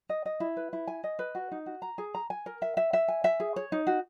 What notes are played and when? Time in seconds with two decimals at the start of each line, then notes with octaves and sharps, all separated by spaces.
0.09 D#5
0.26 D#5
0.40 E4
0.57 B4
0.73 E4
0.87 G#5
1.04 D#5
1.19 B4
1.35 F#4
1.52 D#4
1.66 F#4
1.82 A#5
1.98 G#4
2.15 A#5
2.30 G#5
2.46 A#4
2.62 E5
2.77 E5
2.93 E5
3.08 G#5
3.24 E5
3.40 G#4
3.56 C#5
3.72 D#4
3.87 F#4